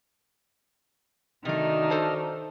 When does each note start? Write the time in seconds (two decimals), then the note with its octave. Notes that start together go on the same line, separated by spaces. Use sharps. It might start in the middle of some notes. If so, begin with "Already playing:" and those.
1.45 C3 D#3 A3 D4 D#4 F#4 D#5 F6
1.90 A4 C5 A5